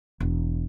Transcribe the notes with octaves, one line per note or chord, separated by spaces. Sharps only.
E1